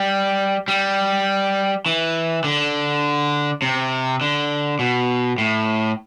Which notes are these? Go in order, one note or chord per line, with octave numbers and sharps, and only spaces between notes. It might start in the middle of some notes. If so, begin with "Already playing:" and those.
Already playing: G3
G3
E3
D3
C3
D3
B2
A2